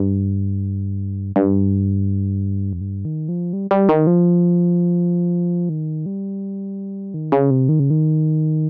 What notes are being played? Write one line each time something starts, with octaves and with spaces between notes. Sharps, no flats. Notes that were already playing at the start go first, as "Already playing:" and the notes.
Already playing: G2
G2
F2
G2
D#3
F3
G3
G3
D#3
F3
D#3
G3
D#3
C#3
C3
D#3
C#3
D#3